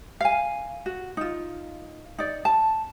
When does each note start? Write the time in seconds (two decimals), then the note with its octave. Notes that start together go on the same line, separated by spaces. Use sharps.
0.21 F5 G#5
0.86 F#4
1.17 D#4 F4
2.18 D#4 D5
2.45 A5